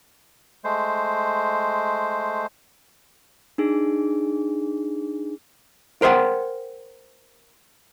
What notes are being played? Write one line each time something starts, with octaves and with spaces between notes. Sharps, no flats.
G#3 A3 C5
D4 D#4 G#4
A#4 C5 E5 F#5 G5